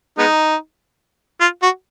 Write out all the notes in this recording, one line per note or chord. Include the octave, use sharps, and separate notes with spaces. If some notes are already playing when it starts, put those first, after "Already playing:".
G#3 B3 D#4
F4
F#4